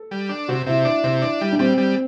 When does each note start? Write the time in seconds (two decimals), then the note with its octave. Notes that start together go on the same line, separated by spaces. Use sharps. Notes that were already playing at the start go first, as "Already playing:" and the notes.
Already playing: A4
0.11 G3
0.29 D4
0.48 C3 F#4
0.66 C3 E4
0.85 D4
1.04 C3
1.22 D4
1.41 G3
1.52 D4
1.59 G3 C4
1.78 G3